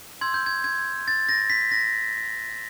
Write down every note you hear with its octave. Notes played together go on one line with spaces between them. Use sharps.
C6 E6 G6 G#6
G6
G#6
G#6
A6
A#6
B6
A#6